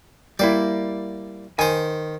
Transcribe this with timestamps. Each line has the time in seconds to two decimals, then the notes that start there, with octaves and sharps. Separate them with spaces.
0.39 G3 A#3 E4 D5
1.59 D#3 C5 G#5